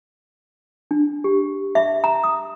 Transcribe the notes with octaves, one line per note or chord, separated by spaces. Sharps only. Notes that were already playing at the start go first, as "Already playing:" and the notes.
D4
G4
E5
A#5
D#6